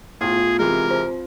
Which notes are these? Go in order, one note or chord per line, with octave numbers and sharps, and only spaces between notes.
A2 B3 E4 F4 G#4
C3 E3 G#3 A#4
C4 C5